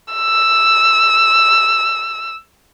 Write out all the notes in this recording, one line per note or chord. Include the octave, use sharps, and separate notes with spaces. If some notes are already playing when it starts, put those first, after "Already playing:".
E6